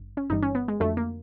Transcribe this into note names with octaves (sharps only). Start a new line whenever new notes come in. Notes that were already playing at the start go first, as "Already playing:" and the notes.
Already playing: G#1 G2
C#4
G1 G2 E3 G3 D#4
C#4
B3
G#3
F2 D3 F#3 A3
A#3